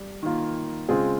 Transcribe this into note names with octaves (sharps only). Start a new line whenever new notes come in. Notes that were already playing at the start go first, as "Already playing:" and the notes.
Already playing: G3
D#3 A#3 F4
C#3 G#3 C4 F4 G#4